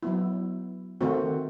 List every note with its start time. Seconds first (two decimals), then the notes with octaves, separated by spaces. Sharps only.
0.03 F#3 B3 E4
1.01 D#3 A3 C4 F#4